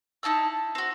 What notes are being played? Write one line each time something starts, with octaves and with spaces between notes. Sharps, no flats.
D#4 E4 A5 E6
C4 F#4